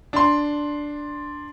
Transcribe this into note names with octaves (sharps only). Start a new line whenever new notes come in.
D4 C6